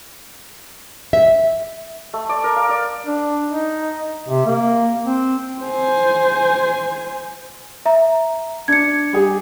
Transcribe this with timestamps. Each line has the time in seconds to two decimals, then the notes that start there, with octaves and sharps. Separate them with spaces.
1.13 E5
2.14 A3
2.29 D5
2.44 A#4
2.56 F5
2.69 D5
3.06 D4
3.50 D#4
4.28 C3
4.46 A#3
5.05 C4
5.62 C5 G#5
7.86 E5 A#5
8.68 D4 G#6 C#7
9.13 G3 G4 G#4